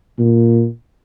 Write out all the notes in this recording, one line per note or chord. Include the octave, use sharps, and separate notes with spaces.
A#2